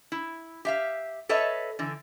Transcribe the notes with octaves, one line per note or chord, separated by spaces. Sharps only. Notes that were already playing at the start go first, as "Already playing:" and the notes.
E4
G4 E5 F5
A4 B4 C#5 D#5 E5
D3 E3